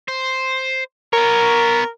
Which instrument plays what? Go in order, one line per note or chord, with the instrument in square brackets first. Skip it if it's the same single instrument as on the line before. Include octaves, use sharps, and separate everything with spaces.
[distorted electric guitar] C5
[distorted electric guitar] B3 C#5 [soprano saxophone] A#4